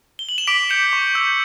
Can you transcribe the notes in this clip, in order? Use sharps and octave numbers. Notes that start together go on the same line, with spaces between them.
G7
F#7
E7
D6 B6 D7
G6 C#7 E7
C#6
E6 G6